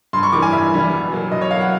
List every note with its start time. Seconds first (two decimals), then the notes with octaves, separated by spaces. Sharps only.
0.13 G2 C6
0.23 C#6
0.32 E3 G3 A#3 D6
0.42 G#5
0.53 G2 E5
0.72 E3 G3 A#3
0.92 B2
1.12 F#3 A#3
1.31 B2 D#5
1.41 C#5
1.51 F#3 A#3 F5
1.61 F#5